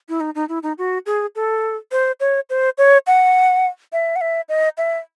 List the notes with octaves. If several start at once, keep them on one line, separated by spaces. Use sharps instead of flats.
E4
D#4
D#4
E4
D#4
F#4
G#4
A4
C5
C#5
C5
C#5
F#5
E5
F#5
E5
D#5
E5